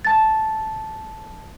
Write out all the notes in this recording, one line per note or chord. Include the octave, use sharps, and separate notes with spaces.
A5 A6